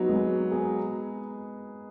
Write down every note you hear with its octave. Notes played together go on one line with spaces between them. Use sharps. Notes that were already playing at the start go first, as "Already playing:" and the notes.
Already playing: F#3 B3 D#4
G#3
G#4